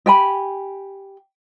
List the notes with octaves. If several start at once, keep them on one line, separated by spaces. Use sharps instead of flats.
G4 G5 G#5 B5